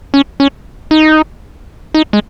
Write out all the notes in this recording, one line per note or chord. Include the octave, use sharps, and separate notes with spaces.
C#4
C#4
D#4
D#4
G#3